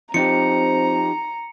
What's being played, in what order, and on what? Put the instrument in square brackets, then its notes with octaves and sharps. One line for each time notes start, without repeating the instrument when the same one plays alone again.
[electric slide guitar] F3 D#4 G4 [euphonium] C4 [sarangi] A#5 [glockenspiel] C#7